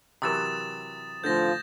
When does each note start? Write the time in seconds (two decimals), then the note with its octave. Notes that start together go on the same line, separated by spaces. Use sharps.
0.22 C3 E3 F#3 G4 A#4 D#6 A6 E7
1.24 A2 D3 F3 A3 G6 A6 A#6